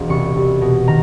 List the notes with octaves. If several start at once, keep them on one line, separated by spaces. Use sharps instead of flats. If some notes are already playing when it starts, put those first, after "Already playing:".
Already playing: E1
C2 C#6
C2
B2
D#3 A#5